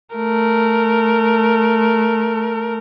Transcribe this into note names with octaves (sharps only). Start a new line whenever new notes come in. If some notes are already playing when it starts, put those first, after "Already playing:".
A3 A#4